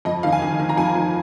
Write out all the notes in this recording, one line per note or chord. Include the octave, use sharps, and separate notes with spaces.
F2 D#5
D#3 F5
G#5
D#3
D#3
A#5
F2 G#5
F2